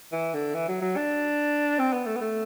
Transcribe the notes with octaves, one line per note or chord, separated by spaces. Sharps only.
E3
D3
E3
F#3
F#3
D4
C4
B3
A3
B3
A3